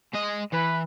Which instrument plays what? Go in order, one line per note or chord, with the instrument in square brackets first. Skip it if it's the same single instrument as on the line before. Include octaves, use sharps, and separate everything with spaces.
[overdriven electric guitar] G#3 D#5
[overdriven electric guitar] E3 [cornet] B4